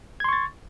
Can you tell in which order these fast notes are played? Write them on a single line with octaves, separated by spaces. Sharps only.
G#6 C6 C#6 A6